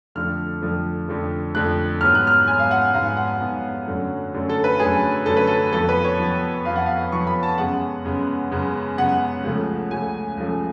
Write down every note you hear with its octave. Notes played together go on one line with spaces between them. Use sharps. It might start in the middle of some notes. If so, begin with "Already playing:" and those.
F2 D3 F3 A3 F6
F2 D3 F3 A3
F2 D3 F3 A3
F2 D3 F3 A3 F#6
G#2 F#3 B3 F6
F#6
F6
G#2 F#3 B3 G#5
F5
F#5
G#2 F#3 B3 F5
F#5
G#2 F#3 B3
F#2 D3 F#3 A3
F#2 D3 F#3 A3
A4
B4
F#2 D3 F#3 A3 G#4
F#2 D3 F#3 A3 A4
B4
A4
F2 F3 B3 A4
B4
C#5
F2 F3 B3
F2 F3 B3 F5
F#5
F5
F2 F3 B3 C#6
B5
A5
F#2 C#3 G#3 B3 F#5
F#2 C#3 G#3 B3
F#2 C#3 G#3 B3
F#2 C#3 G#3 B3 F#5
C#2 C#3 F3 A3
C#2 C#3 F3 A3 G#5
C#2 C#3 F3 A3